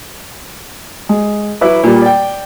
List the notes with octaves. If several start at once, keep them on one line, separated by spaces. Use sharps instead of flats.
G#3
F#3 E4 B4 D6
A#2 G3
D5 G5